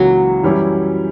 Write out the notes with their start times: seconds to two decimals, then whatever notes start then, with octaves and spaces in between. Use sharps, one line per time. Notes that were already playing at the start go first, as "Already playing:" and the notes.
Already playing: C#2 C#3 E3 F#3 A#3
0.43 F#2 E3 G3 C#4 E4